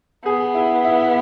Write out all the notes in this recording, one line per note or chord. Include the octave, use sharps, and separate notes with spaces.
B3 G#4
E4
E4